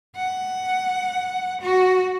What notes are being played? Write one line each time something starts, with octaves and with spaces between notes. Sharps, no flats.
F#5
F#4